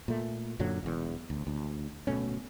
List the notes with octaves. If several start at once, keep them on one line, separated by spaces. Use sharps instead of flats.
A#2 A3
F#2 A#2 D3 F#3
E1 E2
D2
D2
D1 B2 A3 C#4